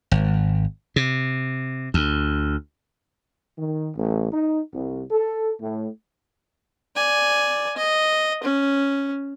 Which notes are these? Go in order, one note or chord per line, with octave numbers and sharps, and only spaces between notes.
G#1
C3
D2
D#3
A1
D#4
C2
A4
A2
D5 G#5
D#5
C#4